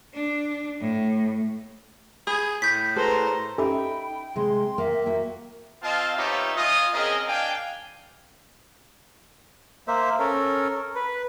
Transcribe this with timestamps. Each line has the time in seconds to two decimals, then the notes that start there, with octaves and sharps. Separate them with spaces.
0.14 D4
0.80 A2
2.27 G#4 B5 D#6
2.62 A2 G6 B6
2.96 G#4 A4 B4 C5 A#5
3.58 C#4 D#4 G4 A4 E5 G5 B5
4.36 C3 G#3 G5 C6
4.78 A#3 E5
5.06 A#3 F#4
5.82 C4 F4 D#5 F5 A5
6.16 B3 D#4 F4 G4 C#5 E5
6.56 F4 D#5 G#5 D#6
6.92 C4 C#4 G#4 A#4 D#5
7.26 D4 F5 G5 G#5
9.88 A#3 C5 E5
10.20 C#4 A4 A#4
10.95 B4